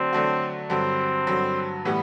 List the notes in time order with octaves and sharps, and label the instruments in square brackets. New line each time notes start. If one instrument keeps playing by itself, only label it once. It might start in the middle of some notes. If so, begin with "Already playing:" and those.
Already playing: [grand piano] D3 F#3 A3 D4 [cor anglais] C4
[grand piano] D3 F#3 A3 D4 F#4
[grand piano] G2 D3 F#3 [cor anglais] C4
[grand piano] G2 D3 F#3
[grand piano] A2 E3 G3 [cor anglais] B3